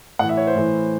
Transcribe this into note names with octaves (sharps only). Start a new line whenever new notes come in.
A2 E3 F#5
E5
C#5
C5
A2 E3